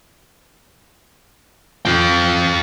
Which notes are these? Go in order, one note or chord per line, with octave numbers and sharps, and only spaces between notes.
F4 G5